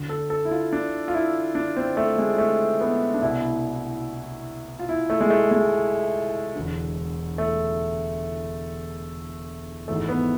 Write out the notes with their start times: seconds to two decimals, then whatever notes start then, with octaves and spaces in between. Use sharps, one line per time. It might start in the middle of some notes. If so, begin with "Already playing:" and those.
Already playing: D2 D3
0.09 A4
0.30 A4
0.45 E4
0.51 F4
0.73 D4
1.08 F4
1.14 E4
1.55 D4
1.76 C4
1.97 A3
2.18 G#3
2.38 A3
2.81 B3
3.14 D4
3.21 C2 B2 E4
4.79 F4
4.89 E4
5.10 A3
5.21 G#3
5.30 A3
5.51 G#3
6.55 E1 D2 D3
7.38 A3
9.88 G#1 G#2 E3 A3
10.09 B3